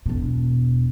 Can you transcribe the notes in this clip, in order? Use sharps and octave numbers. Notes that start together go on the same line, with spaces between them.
E1 B2